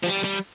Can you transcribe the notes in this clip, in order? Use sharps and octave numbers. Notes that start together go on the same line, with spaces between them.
F3
G3
G3